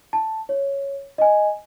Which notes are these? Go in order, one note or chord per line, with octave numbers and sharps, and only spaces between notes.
A5
C#5
D#5 G#5